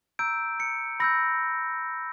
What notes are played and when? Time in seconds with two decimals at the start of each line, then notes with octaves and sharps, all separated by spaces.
0.19 A#5 E6 G6 D7
0.60 C#7
1.00 B5 E6 G6 A#6